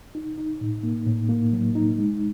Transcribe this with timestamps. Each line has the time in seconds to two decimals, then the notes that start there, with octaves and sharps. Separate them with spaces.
0.15 D#4
0.38 D#4
0.61 A2
0.83 A#3
1.07 A2
1.29 A#3
1.53 F#3
1.75 D#4
1.98 G#3